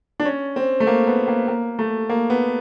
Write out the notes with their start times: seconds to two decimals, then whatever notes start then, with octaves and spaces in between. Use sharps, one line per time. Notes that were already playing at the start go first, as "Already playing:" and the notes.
0.20 D4
0.25 C#4
0.56 C4
0.80 A3
0.87 A#3
1.07 B3
1.28 A#3
1.48 A#3
1.79 A3
2.10 A#3
2.30 B3